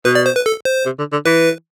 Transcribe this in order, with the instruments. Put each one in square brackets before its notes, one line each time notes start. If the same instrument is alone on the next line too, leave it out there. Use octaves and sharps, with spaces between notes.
[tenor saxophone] B2 [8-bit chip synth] B4
[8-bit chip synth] D5
C5
B4
A4
C5
[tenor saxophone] C3
D3
D3
[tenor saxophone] E3 [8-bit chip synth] B4